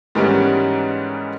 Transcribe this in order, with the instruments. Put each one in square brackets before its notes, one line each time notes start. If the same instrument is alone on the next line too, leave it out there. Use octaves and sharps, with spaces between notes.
[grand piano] G#2 D#3 E3 G3 B3 C#4